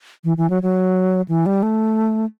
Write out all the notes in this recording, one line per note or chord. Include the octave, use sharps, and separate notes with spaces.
E3
E3
F#3
F#3
E3
G3
A3